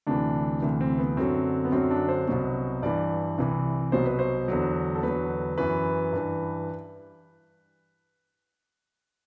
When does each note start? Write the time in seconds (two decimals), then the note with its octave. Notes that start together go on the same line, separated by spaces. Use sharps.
0.07 D2 C3 E3 D4
0.62 D2 C3 E3
0.81 C4
0.99 B3
1.17 F#2 D3 F#3 C4
1.65 B3
1.72 F#2 D3 F#3 C4
1.91 D4
2.09 C5
2.27 C2 B2 F#3
2.82 G2 E3 D5
3.38 C2 C3 E3
3.92 C2 B2 F#3 C5
4.06 B4
4.19 C5
4.48 E2 D3 F#3
4.95 A4
5.03 E2 D3 F#3 B4
5.58 F#2 E3 B4
6.13 G2 E3